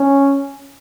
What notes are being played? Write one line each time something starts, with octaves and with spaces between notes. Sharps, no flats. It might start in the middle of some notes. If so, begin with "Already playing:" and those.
Already playing: C#4